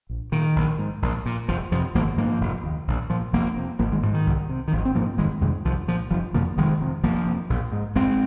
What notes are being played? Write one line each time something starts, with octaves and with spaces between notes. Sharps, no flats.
A#1
A#2 D#3
A#1
G#2
A#1
A#2
F1 F3
F2 C3 F3
G#1 F3 A#3
G#2 F3 A#3
F1
D#2
A#1
A#2 F3
F1 F3 A#3
F2 C3
G#1 F3 A#3
D#3 G#3
G#2 F3
D#3
C2
C3
D#3
G#1 F3
C4
G#2 F3 A#3
F1 D#3 G#3
F2 C3 D#3 G#3
C2 F3
A#2 F3
F1 F3
F2 C3 F3 A#3
F1 D#3 G#3
F2 C3
F1 F3 A#3
F2 C3
A#1
G#2
F1 G#3 C4